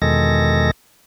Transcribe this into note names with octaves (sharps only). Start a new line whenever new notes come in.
E2 B2 D#3 G#3 A4 A#6